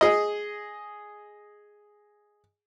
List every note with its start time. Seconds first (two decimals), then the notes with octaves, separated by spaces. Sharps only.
0.01 G#4 D#5